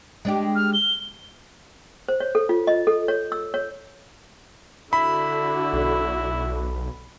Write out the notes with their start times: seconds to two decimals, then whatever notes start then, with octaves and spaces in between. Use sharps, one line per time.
0.25 G#3 D4 G4
0.56 F6
0.74 G7
2.09 C5
2.20 C#5
2.35 A4
2.49 F4
2.67 D#5
2.87 A4
3.08 C#5
3.32 E6
3.54 C#5
4.93 D3 E4 F#4 B5
5.73 B1